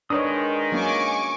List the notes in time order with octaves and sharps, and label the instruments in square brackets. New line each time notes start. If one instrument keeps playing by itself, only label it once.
[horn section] D#3 [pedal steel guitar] G#3 D#6 [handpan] D4 B4 C#5
[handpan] F#3 A#3 C#4 [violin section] G#5 C#6 D6